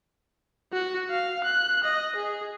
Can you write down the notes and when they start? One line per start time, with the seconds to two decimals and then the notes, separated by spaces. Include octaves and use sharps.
0.72 F#4
1.10 F5
1.44 F#6
1.84 D#5
2.16 G#4